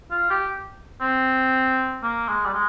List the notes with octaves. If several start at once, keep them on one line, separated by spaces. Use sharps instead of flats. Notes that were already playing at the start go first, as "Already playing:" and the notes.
F4
G4
C4
A#3
G#3
G3
G#3